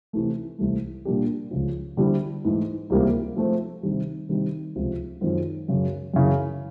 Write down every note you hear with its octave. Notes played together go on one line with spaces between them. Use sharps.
C3 E3 A3
C2 C3 E3 A3
A#2 G3 A#3 D4 G4
C#2 C#3 F3
D3 G3 C4 E4
G#2 E3 A3
C#2 C3 E3 G3 A#3
F3 A3 C4
C3 D#3 G3
C3 D#3 G3
C#2 C3 F3
F#2 D#3 G#3 C4 F4
F#2 C#3 F#3
F#2 C#3 E3